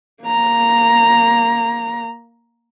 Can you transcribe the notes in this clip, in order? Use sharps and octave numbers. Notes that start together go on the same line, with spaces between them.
A#3 A#5